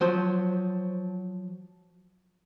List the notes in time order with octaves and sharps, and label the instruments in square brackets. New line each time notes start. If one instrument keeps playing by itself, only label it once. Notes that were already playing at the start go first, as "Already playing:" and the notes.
[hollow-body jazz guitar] F3 F#3 C5